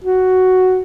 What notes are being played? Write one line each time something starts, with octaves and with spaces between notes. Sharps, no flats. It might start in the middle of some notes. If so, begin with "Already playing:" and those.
F#4